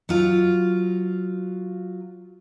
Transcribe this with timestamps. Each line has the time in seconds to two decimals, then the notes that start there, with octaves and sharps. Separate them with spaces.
0.09 F#3 F4